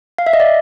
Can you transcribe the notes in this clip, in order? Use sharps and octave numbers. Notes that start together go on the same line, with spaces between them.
F5
E5
D#5
D5